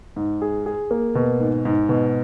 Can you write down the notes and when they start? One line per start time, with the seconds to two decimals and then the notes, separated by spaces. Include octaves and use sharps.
0.16 G#2
0.42 G#4
0.66 G#4
0.91 A#3
1.15 B2
1.40 G#2
1.65 G#2
1.89 B2